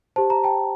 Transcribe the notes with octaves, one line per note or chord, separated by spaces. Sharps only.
G4 C5 A5
A#5
G5 A5